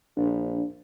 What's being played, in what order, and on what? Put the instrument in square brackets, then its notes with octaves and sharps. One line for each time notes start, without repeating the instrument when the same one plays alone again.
[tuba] A#1 [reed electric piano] D4